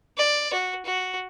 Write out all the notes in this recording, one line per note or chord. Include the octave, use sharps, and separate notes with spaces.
D5
F#4
F#4